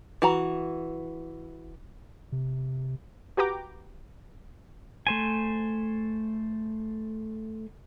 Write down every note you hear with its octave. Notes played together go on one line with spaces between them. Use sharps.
E3 F#4 A#5
C3
F#4 G4 B4 G5 A#5 D6
A3 C5 G#5